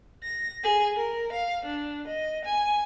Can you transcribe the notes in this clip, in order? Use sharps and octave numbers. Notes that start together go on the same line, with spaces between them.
A#6
G#4
A#4
F5
D4
D#5
G#5